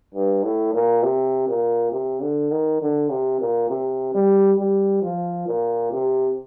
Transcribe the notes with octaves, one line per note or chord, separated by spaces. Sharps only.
G2
A2
A#2
C3
A#2
C3
D3
D#3
D3
C3
A#2
C3
G3
G3
F3
A#2
C3